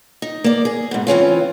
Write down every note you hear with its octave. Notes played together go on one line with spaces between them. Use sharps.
D#4
A#3 D5
G#4
G#2 B2
E3 C4 C#4 F4